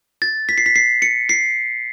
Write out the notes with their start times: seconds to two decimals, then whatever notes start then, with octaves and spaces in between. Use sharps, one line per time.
0.22 A6
0.49 B6
0.58 C7
0.66 B6
0.76 C7
1.02 C#7
1.29 C7